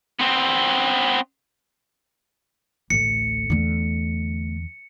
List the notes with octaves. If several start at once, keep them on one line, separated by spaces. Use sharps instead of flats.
B3 C4
A1 D2 C#7
E2 D3 A3